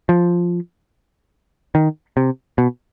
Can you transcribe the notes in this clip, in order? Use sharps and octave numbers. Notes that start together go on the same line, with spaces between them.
F3
D#3
C3
B2